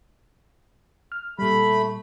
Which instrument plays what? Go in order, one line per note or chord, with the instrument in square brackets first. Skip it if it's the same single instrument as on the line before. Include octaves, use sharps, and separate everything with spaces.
[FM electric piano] F6
[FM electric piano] A#2 G3 [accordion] A3 B5